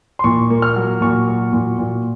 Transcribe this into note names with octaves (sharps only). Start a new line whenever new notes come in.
C6
A#2 C#6
A#3
F6
F#3
A#2 C#6
F#3
A#2
A#2